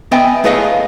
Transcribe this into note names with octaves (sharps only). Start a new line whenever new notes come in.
B3 D#5 E5 G5 G#5
A3 G#4 B4 C#5 D#5 F5